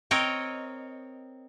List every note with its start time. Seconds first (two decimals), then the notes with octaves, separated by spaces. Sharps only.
0.11 C4 A#4 C#5 D#5 G5